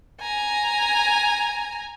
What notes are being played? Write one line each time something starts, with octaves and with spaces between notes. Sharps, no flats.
G#5 A#5